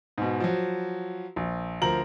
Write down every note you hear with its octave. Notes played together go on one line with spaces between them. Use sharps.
G#2 B2
F3 F#3
A#1
D2 F3 A#4 A#5 F#7